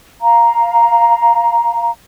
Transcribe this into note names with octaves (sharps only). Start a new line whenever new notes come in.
F5 A#5